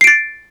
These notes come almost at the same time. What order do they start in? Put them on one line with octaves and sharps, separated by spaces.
C7 D7 A6